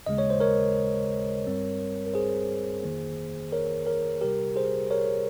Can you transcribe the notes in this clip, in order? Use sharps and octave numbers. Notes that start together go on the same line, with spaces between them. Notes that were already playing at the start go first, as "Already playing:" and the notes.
D#2 C#3 G#3 D#5
C#5
C5
A#4 C#5
G1 G2 G3 C4
A#4
G#4 C5
G1 F2 D#3 A#3
A#4 C#5
A#4 C#5
C2 C3 G3 G4 A#4
G#4 C5
A#4 C#5